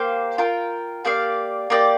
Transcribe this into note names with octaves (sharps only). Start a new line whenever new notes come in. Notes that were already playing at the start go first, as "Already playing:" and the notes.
Already playing: A#3 G4 C5 F5
F4 A#4 G5
A#3 G4 D5 F5
A#3 G4 D5